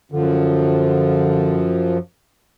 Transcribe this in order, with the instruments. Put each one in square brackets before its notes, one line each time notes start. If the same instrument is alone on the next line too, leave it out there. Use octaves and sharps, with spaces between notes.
[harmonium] F#2 F3 [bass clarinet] D3